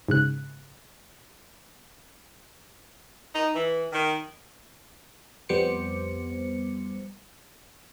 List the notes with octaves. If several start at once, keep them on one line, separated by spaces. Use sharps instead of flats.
G#2 C#3 F#6
D#4
E3
D#3
F2 G3 B3 C5 D6 C#7